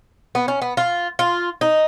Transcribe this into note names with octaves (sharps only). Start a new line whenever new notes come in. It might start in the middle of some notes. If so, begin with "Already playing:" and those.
B3
C#4
B3
F4
F4
D#4